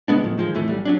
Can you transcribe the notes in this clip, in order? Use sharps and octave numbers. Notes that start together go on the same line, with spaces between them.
C#3 G#3 B3 D4
A2 F3 F#3
D#3 F3 G#3
F2 A2 E3 A3
B1 G3
F#3 C#4 D4